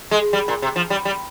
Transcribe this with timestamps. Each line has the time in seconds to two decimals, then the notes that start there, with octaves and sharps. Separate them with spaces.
0.11 G#3
0.33 G3
0.48 A#2
0.62 C3
0.76 F3
0.90 G3
1.05 G3